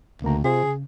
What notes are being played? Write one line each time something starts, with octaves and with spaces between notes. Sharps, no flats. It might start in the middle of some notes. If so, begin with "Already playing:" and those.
D2 C#3 A#3 A#5
C3 F4 G#4 C5
C#3